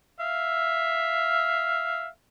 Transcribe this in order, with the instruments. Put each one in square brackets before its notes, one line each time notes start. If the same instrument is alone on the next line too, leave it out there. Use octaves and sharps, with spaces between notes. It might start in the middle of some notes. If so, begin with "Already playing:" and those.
[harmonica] E5 F5